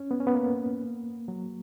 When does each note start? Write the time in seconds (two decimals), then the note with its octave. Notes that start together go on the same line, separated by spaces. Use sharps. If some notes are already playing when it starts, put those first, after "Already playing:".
Already playing: C#4
0.11 B3
0.20 C#4
0.27 B3
0.35 A#3
1.28 F#3